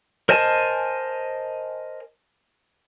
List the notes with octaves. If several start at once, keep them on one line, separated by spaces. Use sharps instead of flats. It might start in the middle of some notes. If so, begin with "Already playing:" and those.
A#4 C5 D#5 G#5 A5